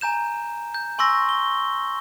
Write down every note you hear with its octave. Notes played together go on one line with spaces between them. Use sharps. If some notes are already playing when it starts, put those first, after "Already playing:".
G#5 A#5 G6 E7
G6
G#5 C6 C#6 E6 A#6
G7